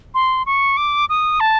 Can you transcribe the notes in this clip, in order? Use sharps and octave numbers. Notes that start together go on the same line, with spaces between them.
C6
C#6
D6
D#6
A5